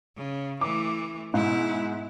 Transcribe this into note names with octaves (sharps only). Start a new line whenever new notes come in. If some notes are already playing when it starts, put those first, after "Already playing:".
C#3
E3 A3 D6
G#2 B2 E4